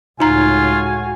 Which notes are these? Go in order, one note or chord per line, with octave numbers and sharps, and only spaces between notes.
C#2 A2 D#4 F4 F#4 G#5 A#5